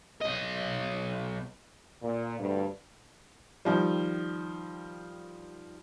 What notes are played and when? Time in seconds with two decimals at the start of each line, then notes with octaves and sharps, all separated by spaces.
0.21 B1 D#5
2.02 A#2
2.38 D2 G2
3.65 D#3 F3 G3